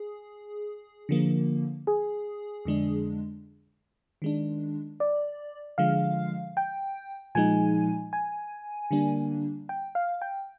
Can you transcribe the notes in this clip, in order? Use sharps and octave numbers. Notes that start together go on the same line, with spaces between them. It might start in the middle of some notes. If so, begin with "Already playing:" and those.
Already playing: G#4
D3 F3 A#3
G#4
F2 D3 G#3 D4
D#3 G#3 D4
D5
D3 F3 G#3 F5
G5
A#2 F3 G#3 D#4 G#5
G#5
D3 G3 A#3 D4
G5
F5
G5